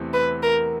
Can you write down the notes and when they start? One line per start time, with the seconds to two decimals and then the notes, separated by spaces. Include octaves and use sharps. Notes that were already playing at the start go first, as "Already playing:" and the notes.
Already playing: E2 C3 E3 A3 C4
0.13 B4
0.43 A#4